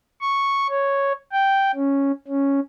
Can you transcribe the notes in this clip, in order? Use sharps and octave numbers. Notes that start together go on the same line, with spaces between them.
C#6
C#5
G5
C#4
C#4